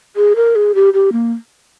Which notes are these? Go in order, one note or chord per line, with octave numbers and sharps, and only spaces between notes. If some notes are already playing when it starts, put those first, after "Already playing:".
G#4
A#4
G#4
G4
G4
A#3